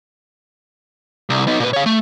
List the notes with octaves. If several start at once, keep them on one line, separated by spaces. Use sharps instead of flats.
C2
B3 D#4
A#2 B4
C#5 F5
A3